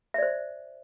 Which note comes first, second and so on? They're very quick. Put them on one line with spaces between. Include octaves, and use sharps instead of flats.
E5 D5 C5